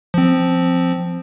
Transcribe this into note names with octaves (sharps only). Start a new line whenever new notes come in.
F3 C4